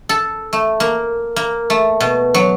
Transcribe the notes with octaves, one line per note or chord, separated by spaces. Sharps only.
A4
A3
A#3
A#3
A3
B2
F#3